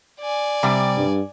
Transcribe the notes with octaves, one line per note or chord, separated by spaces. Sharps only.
D5 G#5
C3 G3
G2